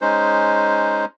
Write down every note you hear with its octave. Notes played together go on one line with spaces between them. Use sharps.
G#3 C#4 D#4 C5